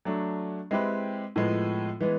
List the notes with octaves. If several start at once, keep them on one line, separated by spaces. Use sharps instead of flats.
F#3 A3 D4
G#3 C4 E4 G4 B4
A2 F3 G#3 B3
E3 G#3 B3